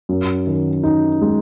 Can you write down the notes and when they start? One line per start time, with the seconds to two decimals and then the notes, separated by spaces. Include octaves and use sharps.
0.09 F#2
0.47 D#3
0.83 D#4
1.21 G#3